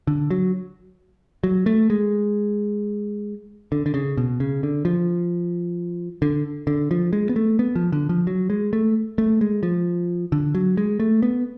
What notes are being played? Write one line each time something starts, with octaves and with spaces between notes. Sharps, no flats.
D3
F#3
F#3
A3
G#3
D3
D3
C#3
B2
C#3
D3
F3
D3
D3
F3
G#3
B3
A3
B3
F3
D3
F3
F#3
G#3
A3
A3
G#3
F3
D3
F#3
G#3
A3
B3